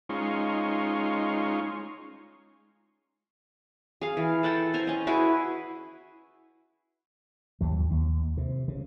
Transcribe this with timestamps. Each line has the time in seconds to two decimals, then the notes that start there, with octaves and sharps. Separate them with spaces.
0.09 G#3 C#4 D#4 F4 C6 C#6
4.01 G#4 F5
4.17 E3
4.43 A4 F#5 G5 A5
4.74 C5 G#5 A#5
4.87 C#4 D#5
5.07 E4 F#4 G#4 B4
7.61 D#2 F#3
7.90 D#2
8.37 C3
8.68 C#3